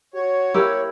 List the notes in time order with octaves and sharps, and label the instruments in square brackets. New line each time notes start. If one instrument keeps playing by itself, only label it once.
[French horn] F#4 [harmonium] C#5
[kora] A#3 G4 [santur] E4 B5